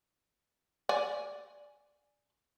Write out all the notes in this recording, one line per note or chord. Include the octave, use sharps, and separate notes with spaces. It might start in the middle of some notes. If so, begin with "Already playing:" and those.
D5 G#5